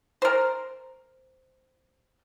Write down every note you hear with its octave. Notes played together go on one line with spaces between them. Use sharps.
A#4 C5